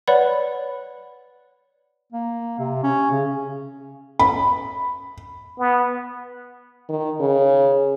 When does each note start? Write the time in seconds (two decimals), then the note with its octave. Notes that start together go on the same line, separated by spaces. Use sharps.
0.08 B4 C#5 D5 F#5 B5
2.13 A#3
2.59 C3
2.83 C#4
3.11 C#3
4.19 B5
5.59 B3
6.89 D#3
7.20 C#3